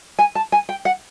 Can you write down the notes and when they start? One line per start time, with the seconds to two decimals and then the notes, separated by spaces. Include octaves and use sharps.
0.19 G#5
0.35 A5
0.52 G#5
0.69 G5
0.85 F#5